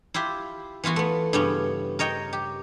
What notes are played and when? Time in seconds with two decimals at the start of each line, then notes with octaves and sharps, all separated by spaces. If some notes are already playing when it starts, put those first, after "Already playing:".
0.14 E4 F4 G4 E5
0.84 E3 B3 F4 F#4
0.96 A3 B3
1.33 G2 C#3 B3 C#4
1.99 A#4 C#5 D#5 G5
2.33 G4